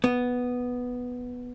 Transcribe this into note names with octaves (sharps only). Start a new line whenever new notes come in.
B3